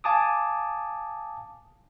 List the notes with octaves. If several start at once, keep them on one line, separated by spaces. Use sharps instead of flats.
F5 G#5 A5 D6 D#6